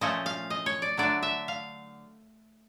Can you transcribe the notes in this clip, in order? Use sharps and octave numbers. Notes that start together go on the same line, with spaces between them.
A#2 F3 A3 C#4 D#5
F5
D#5
C#5
D5
D3 F#3 A3 D4 D5
E5
F5